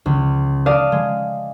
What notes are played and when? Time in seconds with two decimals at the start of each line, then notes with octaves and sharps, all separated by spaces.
0.06 C#2
0.66 D5 F5 A5 D#6
0.92 G#3